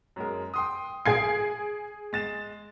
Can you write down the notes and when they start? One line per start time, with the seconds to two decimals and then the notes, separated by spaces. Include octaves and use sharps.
0.16 F#2 G#3 A#4
0.54 G5 C6 D#6
1.06 G#4 D#6 G#6 C7 D7
2.13 G#3 A6 E7